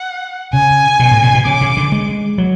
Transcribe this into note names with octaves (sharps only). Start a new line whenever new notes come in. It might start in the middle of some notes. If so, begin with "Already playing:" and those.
Already playing: F#5
C#3 G#5
B2
A2
B2
B2
C#3 D6
C#3
D3
G#3
F#3